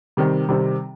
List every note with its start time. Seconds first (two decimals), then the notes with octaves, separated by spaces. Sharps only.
0.17 C3 D#3 G3 C4
0.49 C3 D#3 G3 C4